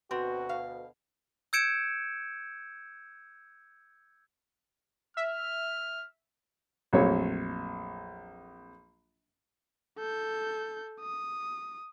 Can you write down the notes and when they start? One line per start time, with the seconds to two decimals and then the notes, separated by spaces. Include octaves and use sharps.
0.11 D2 B2 C4 F#4
0.49 F5
1.53 E6 G6 G#6 C#7 D7 E7
5.17 E5 F6
6.93 A#1 F2 F#3 A3 C#5
9.98 A4 G6
11.00 D#6